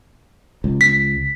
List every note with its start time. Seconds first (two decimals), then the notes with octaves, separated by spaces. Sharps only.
0.64 C#2
0.81 B6